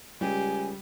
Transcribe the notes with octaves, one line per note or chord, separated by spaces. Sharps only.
C#2 G3 G4 G#5